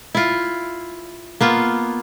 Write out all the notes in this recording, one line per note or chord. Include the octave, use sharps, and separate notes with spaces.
E4 F4
A#3 B3 F4